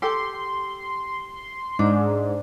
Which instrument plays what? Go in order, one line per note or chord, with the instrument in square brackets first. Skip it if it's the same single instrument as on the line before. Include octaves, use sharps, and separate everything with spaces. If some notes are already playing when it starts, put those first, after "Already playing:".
[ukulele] G4 A4 G5 [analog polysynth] C6
[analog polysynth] G#2 [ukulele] D4